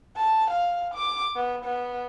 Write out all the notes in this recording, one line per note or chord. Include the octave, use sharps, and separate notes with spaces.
A5
F5
D6
B3
B3